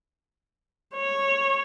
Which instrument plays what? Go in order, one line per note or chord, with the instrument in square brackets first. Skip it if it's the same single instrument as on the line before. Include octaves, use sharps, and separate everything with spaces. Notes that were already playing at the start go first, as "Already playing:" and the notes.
[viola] C#5